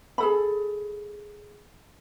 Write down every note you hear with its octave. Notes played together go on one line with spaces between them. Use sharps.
G#4 A4 B5